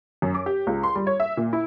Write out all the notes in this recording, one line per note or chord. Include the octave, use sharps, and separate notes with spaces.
F#2
D6
G4
C#2
C6
G3
C#5
E5
A#2
E4